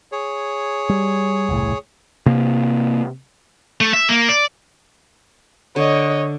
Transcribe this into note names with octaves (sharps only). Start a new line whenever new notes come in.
G#4 C#5
G3
E1 C2 A2
C3 A#3
A3
E5
A#3
D5
D3 C#5 D#5